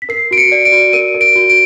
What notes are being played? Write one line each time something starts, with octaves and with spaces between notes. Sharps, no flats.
B6
A#4 C7
F#4 D7
C#7
D5
D7
F#4
A#4 D#7
A#4
D7
F#4
D7